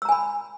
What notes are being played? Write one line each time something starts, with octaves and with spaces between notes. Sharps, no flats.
G#5 A#5 B5 E6